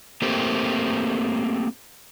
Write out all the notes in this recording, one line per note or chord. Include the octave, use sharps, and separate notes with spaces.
A3 A#3 C4 G4